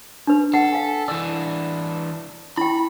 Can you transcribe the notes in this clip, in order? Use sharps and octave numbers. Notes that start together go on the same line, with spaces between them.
D4 B4
A4 F#5
F5 G#5
E3 D4 E6
E4 G5 B5